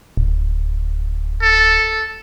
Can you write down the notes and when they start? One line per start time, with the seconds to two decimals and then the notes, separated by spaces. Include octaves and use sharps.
0.17 D1
1.42 A4